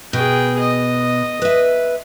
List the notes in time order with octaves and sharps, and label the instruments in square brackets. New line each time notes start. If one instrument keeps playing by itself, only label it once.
[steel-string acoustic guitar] B2 [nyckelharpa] G#4 G5
[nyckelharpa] D#5
[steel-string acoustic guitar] B4 E5